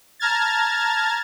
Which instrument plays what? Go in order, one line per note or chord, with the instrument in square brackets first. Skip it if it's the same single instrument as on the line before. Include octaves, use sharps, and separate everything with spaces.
[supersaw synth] A5 A#5 F6 G#6 A6